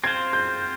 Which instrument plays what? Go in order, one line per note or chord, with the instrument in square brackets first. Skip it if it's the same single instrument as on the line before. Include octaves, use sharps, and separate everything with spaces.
[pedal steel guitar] C4 F4 C5 [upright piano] G#6
[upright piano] G6